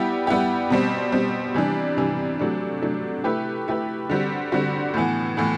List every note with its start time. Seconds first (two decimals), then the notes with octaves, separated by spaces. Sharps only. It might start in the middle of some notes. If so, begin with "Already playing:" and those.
Already playing: G3 B3 E4 G4
0.27 G3 B3 E4 G4
0.70 B2 G3 C4
1.12 B2 G3 C4
1.54 C3 E3 G3 D4
1.97 C3 E3 G3 D4
2.39 C3 F#3 A3 D4
2.82 C3 F#3 A3 D4
3.24 A3 E4 G4 B4
3.68 A3 E4 G4 B4
4.10 D3 G3 C4 F#4
4.52 D3 G3 C4 F#4
4.94 A2 E3 B3
5.37 A2 E3 B3